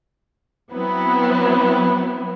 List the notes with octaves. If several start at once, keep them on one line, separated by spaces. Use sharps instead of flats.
F#3 B3 C4 E4